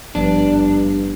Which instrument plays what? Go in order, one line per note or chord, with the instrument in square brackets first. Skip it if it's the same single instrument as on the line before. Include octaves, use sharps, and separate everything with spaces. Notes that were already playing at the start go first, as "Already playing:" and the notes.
[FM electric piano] G#1 B3 [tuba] G2 [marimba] F3 [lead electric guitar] D4